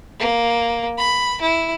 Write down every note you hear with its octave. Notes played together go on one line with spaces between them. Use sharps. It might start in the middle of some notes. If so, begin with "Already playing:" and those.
A#3
B5
E4